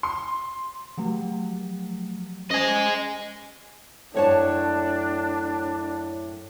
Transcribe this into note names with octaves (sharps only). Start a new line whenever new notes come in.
C6
F3 F#3 A3
C#4 C5 D#5 G#5 C7
F#2 A2 D4 C#5 A5